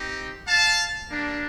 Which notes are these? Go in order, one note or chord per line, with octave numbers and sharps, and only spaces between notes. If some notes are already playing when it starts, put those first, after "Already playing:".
Already playing: C4 D#4 G4
F5 A5
G3 A#3 D4